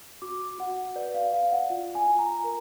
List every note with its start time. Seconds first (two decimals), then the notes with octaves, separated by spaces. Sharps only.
0.22 F#4 D6
0.59 F#4 F#5
0.96 B4 D5
1.14 F5
1.32 D5 F5
1.52 F#5
1.70 F4
1.95 G#5
2.07 F4
2.19 A#5
2.44 A#4